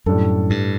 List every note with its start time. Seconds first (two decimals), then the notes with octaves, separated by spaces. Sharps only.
0.06 F#2 A2 G3 D4 A4
0.50 G2